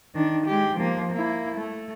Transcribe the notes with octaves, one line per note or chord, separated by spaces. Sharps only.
D#3 D4
G#3 G4
F3 A#3
A#3 E4
A3